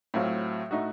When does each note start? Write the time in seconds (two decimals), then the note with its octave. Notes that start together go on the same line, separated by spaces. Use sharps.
0.14 A2 F#3 C4 F4
0.71 A2 A3 D#4 F#4